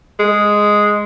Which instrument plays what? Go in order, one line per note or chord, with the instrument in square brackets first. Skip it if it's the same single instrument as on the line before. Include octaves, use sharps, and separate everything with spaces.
[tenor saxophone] G#3